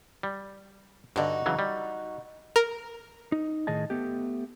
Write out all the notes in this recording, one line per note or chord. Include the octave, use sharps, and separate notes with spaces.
G3
G2 D3 D#4 F#4
C#3 E3 F#3
G3
A#4
D#4
A2 D#3 G#4 D#5 A5
A3 B3 G4